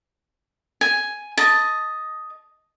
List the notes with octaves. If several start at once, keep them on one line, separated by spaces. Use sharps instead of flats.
G#5
D#5 A5